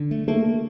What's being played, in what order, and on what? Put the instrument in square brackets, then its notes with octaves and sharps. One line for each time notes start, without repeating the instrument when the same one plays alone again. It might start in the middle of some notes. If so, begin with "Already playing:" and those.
Already playing: [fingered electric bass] D3
A3
[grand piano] A3 [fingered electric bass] A#3